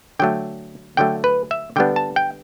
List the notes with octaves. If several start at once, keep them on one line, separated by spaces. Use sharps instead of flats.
D3 F#3 A3 G5
D3 F#3 A3 G5
B4
E5
D3 G3 B3 D4 G5
A5
G5